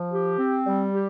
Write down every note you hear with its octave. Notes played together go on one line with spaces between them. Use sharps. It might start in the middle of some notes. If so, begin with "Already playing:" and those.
Already playing: F3
G4
C4
G3
G4